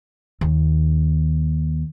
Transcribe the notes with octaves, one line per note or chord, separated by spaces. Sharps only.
D#2